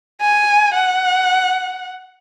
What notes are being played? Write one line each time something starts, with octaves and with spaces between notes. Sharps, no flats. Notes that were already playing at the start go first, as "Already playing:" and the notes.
G#5
F#5